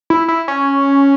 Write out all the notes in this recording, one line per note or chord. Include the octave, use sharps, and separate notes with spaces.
E4
E4
C#4